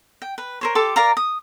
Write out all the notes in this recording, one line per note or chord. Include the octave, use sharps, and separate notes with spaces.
G5
B4
A#4 C5 C#5
G4 A4 C6 D6
A#4 D5 F5 A#5
D#6